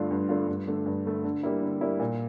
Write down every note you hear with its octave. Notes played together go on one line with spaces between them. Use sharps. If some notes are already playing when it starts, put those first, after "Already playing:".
Already playing: G2 D3 A3 D4 F4
G2
D3 A3 D4 F4
G2
D3 A3
G2
D3 A3
D3
G3 A#3 E4
D3
G3 A#3 E4
A#2